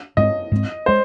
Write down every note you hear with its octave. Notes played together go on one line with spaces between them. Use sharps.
G#2 G#3 C4 D#5
G#2 G#3 C4
G#3 C5